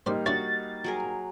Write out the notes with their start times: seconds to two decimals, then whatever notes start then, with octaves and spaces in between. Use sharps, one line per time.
0.06 G3 A#3 D#4 C5 D5
0.26 D4 E4 F#4 C#5 A6
0.84 F#3 G#4 A#4